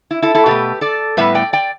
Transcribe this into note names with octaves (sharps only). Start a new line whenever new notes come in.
E4
E4 A4
E4 A4
B2 A3 G4 B4
A4 D5
A2 G3 B3 B4 E5
D5 G5
D5 G5